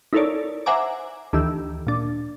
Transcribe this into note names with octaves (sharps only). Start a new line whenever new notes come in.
D#4 E4 A4 A#4 C#5 D5
C5 E5 F#5 G#5 A#5 D6
D2 D#3 E3 G4 E6
A#2 D4